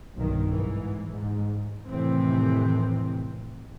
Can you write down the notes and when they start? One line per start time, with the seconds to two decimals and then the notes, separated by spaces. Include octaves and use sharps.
0.16 B1 G2 D#3
0.52 G#2 E3
1.11 G#2
1.88 F2 A2 C3 D#3 E3 C4